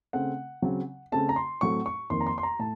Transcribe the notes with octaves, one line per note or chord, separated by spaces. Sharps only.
C#3 A3 C4 F#5
C#3 F#3 C4
C#3 A3 C4 A5
A#5
C6
A2 F#3 A3 C4 C#6
C#6
F2 D#3 A#3 C6
A#5
C6
C6
A#5
A2 A5